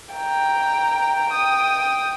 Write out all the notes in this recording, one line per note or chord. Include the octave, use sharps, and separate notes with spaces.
G5 A#5
G5 D#6